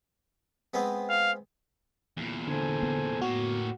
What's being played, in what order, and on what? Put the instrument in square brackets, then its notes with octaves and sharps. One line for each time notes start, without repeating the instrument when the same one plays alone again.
[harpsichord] G#3 B3 C4
[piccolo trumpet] F5
[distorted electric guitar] E2 A#2
[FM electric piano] D3 [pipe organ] A4 C5 G#5
[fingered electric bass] B3
[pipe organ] A2 [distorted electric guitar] A#3 C#5 [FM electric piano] F#4